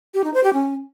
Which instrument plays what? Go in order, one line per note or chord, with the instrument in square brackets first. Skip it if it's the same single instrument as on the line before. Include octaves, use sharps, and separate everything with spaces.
[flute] G4
D#4
C5
G4
C#4